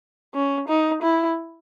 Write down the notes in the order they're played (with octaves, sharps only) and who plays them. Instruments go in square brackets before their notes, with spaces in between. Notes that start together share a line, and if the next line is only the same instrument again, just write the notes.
[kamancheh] C#4
D#4
E4